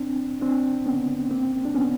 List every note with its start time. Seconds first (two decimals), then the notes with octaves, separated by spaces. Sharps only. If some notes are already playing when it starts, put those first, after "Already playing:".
Already playing: C4 D4
0.41 C4 D4
0.86 B3 C#4
1.31 A#3 C4
1.65 D4
1.75 B3 C#4